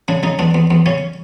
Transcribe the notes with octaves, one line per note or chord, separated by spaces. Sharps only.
C#3 D4
C#3 D#4
E2 D4
E2
E2
C#3 C#4